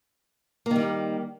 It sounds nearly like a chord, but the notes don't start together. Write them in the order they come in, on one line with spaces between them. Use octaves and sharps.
A#3 D#3 G3